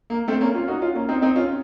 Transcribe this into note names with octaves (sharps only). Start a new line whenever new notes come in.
A#3
A3 C4
A#3 C#4
C#4 F4
D#4 F#4
C#4 F4
A#3 C#4
C4 D#4
C4 D#4
C#4 F4